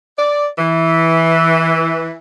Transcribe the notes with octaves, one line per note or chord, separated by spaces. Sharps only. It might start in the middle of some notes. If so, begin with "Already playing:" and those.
D5
E3